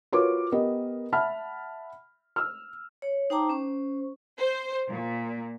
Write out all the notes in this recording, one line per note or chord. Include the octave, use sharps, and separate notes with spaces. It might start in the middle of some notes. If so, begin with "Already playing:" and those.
F4 F#4 A#4 B4 C#5 D6
B3 G4 A#4 D#5
E5 F#5 A5 B5 F6
E6 F6
C#5
D#4 C5 G5 A5 A#5 D6
C#4 C5 C#6
C5
A#2